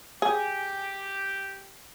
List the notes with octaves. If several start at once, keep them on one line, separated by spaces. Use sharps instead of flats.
G4 G#4